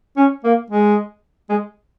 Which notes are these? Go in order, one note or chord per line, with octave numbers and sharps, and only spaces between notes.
C#4
A#3
G#3
G#3